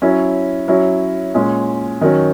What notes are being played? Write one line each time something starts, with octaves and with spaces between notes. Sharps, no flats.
F#3 C#4 E4
F#3 C#4 E4
A#2 G#3 C#4
D#3 F#3 C#4